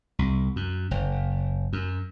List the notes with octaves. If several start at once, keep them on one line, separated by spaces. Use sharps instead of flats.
C2
F#2
F#1
F#2